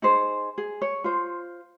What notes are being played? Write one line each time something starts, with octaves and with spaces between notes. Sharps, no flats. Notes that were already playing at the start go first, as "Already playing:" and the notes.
D#4 G#4 C5
G#4
C#5
F4 C5